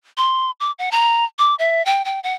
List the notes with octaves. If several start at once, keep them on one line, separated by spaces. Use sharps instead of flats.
C6
D6
F#5
A#5
D6
E5
G5
G5
F#5